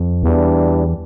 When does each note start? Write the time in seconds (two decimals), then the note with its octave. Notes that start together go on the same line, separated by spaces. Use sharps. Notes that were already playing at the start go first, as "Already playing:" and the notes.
Already playing: F2
0.22 E2 E3 G3 D4